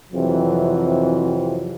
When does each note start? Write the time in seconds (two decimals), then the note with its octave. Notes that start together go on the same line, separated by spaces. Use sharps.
0.12 F2 C3 E3 F#3